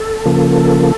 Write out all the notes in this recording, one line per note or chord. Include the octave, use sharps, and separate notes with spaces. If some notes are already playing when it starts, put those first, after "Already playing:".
Already playing: A4
C#3 F3 A#3